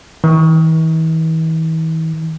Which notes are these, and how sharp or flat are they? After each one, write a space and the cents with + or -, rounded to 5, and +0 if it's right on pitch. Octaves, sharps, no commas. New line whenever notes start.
E3 -45